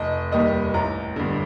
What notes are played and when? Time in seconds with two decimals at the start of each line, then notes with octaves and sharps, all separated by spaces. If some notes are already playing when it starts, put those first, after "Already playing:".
Already playing: F1 D#5
0.32 D#2 D#3 G3 D#5
0.74 A1 A#5
1.16 G2 D3